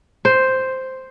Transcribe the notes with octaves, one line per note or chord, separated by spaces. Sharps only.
C5